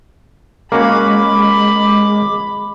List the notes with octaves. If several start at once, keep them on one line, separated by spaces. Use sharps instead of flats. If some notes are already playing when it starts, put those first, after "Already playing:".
G#3 A#3 C#4 F#4 B5 D6